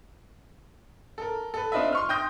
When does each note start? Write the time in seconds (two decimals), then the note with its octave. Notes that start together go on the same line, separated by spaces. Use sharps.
1.18 A4 A#4
1.54 A4 B4
1.72 C4 D4 F4 B4 D#5 E5
1.93 C6 C#6 F6
2.09 G5 C6 D#6 G6 A#6